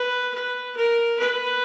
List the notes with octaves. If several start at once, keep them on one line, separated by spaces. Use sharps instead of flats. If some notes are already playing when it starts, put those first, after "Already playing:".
Already playing: B4
B4
A#4
B4